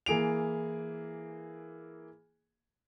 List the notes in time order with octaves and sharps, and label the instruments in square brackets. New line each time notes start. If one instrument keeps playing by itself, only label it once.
[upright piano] E3 A#3 G#4 D7 F7